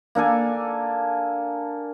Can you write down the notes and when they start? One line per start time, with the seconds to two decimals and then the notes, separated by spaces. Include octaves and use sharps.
0.15 A#3 D4 A4 G#5